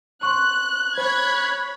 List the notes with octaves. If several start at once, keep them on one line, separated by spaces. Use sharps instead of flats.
C6 C#6 F#6
C5 C#5 B5 F#6 G#6